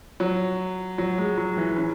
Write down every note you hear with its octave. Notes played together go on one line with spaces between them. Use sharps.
F#3
F#3
G#3
F#3
E3
C#4